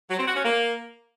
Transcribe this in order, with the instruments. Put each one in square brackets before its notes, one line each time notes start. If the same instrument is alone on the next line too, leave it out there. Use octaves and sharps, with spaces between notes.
[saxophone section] F#3
C4
F#4
C#4
A#3